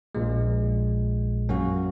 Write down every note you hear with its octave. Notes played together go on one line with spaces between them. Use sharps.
A#1 A#2 G#3
F#2 F#3 A#3 C#4 F#4